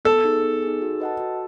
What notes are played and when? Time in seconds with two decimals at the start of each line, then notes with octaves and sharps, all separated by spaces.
0.05 B3 A4
0.25 D#4 G#4
0.43 B3
0.62 D#4 G#4
0.82 F#4
1.00 B4 D#5 F#5 A5
1.20 F#4